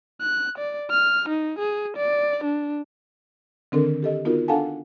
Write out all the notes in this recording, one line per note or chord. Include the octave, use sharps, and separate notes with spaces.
F#6
D5
F6
D#4
G#4
D5
D4
D3 D#3 C4 D4 A4 A#4
G4 A4 D#5
B3 D#4 F4 F#4 A#4
D4 A4 F5 F#5 G#5 A5